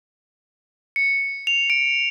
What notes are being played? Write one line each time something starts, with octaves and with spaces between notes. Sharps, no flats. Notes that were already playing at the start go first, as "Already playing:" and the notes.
C#7
F7
D7